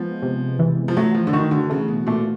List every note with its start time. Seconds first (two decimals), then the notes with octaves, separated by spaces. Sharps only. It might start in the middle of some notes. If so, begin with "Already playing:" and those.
Already playing: F3 G#3 B3
0.23 C3
0.59 E3
0.88 F3
0.97 F#3 A3
1.15 F3
1.27 D3
1.33 D#3 F#4
1.51 D3
1.70 C#3 A3
1.88 B2
2.07 A#2 A3